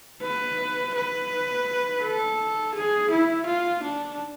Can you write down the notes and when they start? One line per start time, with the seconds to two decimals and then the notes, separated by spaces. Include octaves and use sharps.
0.21 B4
0.94 B4
2.01 A4
2.74 G#4
3.10 E4
3.46 F4
3.83 D4